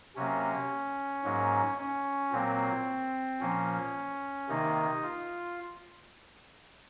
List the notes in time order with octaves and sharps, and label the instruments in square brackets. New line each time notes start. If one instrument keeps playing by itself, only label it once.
[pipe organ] C3 F#3 A#3 C#4
G#2 F#3 A#3
C#4
A#2 F#3 A#3 C4
A#2 F3 A#3 C#4
C3 D#3 A#3 D#4
F4